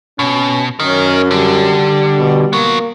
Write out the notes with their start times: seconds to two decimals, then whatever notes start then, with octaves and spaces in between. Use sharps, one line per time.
0.19 B2 C#4
0.80 F#2 C#4 A#4 D#5
1.31 D3 G3
2.19 B2
2.53 F#3 A#3 B3